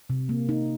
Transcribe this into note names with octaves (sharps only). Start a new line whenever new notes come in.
C3
A#3
D#4